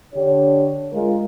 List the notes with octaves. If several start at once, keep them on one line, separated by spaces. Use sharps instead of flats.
D3 D4 G4 C#5
G#3 F4 A#4